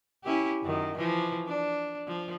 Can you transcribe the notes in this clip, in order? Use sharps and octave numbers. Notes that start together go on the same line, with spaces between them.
C#4 E4 G4
F#2 D#3
E3 F3
D4
F3